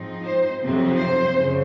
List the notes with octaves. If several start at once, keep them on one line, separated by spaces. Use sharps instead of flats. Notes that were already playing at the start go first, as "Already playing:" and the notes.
Already playing: G#2 F3 C4 D#4
C5
F2 C3 F#3 C4 D#4
C5
F#2 C#3